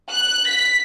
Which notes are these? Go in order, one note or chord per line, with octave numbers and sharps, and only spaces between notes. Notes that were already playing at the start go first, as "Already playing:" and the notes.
F#6
B6